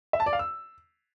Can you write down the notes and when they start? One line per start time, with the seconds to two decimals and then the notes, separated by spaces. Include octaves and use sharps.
0.13 E5
0.20 A5
0.26 D5
0.33 F5
0.39 E6